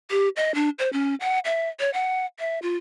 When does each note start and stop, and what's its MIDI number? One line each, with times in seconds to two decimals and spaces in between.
0.11 0.29 67
0.36 0.54 75
0.55 0.69 62
0.79 0.90 72
0.93 1.15 61
1.21 1.39 78
1.45 1.69 76
1.80 1.92 73
1.94 2.26 78
2.39 2.59 76
2.62 2.77 65